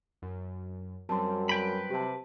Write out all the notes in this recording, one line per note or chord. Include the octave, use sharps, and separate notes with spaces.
F#2
F#2 F#3 G3 C4 A5 C6
B4 G5 B5
C3 G4 A5